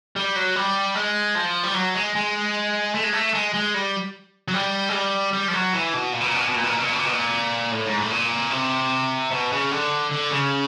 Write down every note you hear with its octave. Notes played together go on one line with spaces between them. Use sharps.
G3
F#3
G3
G#3
F3
G3
F#3
G#3
G#3
A3
G#3
A3
G#3
G#3
G3
F#3
G3
G#3
G3
G3
F3
F#3
E3
B2
A#2
B2
A#2
B2
A#2
B2
A#2
B2
A#2
B2
A#2
B2
A#2
B2
A#2
A2
G#2
A2
A#2
C3
B2
C#3
D3
D3
C#3